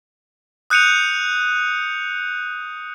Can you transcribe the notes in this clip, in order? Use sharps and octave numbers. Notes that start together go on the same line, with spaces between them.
D#6 F#6 G6 C#7 D#7 F7